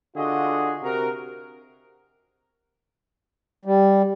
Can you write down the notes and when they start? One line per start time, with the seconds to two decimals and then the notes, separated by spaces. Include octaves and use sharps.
0.16 D3 F4 F#4 G#4 D#5
0.82 C3 F#4 A#4
3.65 G3